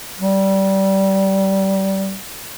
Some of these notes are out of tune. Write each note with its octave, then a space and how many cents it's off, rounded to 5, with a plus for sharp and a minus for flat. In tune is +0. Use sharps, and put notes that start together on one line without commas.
G3 -20